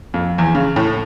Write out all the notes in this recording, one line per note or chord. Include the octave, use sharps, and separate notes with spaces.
F2
E2
C#3
A2